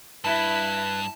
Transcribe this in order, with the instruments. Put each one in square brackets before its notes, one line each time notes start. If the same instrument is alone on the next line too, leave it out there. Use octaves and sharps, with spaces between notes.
[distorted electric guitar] G2 [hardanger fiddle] E4 [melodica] B4 [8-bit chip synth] A5